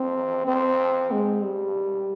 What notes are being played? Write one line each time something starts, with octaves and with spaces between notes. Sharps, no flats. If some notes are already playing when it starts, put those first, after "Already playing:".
Already playing: C4
C4
G#3
G3